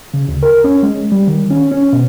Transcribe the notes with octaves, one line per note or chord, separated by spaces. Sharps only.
C#3
D2
A#4
C#4
G#3
G3
D#3
C#4
C#4
B2